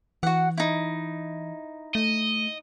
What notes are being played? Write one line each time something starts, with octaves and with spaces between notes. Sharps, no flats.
E3 F#4 F#5
D#4 E4
A3 D#5